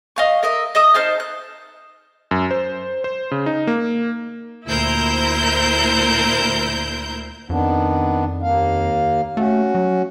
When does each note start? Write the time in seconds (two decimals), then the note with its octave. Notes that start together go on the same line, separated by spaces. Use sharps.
0.16 D#5 F5 C#6
0.43 A#4 D#5 E5
0.75 D#5 E5 D#6
0.94 D#4 C5 A5 F6
1.20 F#6
2.31 F#2
2.51 C5
3.04 C5
3.31 C#3
3.46 D#4
3.67 A#3
4.67 D2 A#2 E4 A#4 C5 G6
7.50 F2 D#3 B3 D4
8.42 D#2 A#3 F5
9.37 A3 C#4 F#4
9.75 F#3